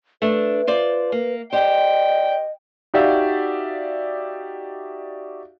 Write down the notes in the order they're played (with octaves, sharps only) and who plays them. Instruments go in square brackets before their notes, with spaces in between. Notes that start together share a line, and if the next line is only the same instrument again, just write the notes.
[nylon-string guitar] A3 D4 [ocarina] B4
[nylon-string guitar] F4 C5 D5
A#3
[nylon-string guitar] G4 C5 [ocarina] D5 [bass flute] D#5 [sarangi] G5
[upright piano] D#4 F#4 G4 D5 E5 F5